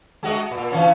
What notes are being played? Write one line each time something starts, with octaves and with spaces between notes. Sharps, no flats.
G#3 F#4 D#5
A#2
E3 C#4